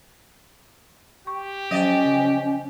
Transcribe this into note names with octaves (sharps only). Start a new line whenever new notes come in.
G4 C#6
F3 F#3 C#4 D5 D#5
C#3